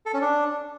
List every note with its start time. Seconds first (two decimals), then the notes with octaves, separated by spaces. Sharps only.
0.06 A4
0.14 C#4
0.21 D4